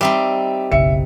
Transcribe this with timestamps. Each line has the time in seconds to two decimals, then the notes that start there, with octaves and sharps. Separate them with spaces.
0.01 G3 C4 D#4 E5 D6
0.72 F#1 B1 E5 C#7